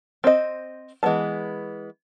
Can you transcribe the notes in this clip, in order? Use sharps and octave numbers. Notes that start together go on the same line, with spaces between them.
C4 C5 D#5
E3 G#3 A#3 B3 A5